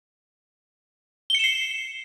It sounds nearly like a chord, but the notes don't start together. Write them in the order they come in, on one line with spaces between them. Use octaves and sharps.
G7 C#7 E7 C7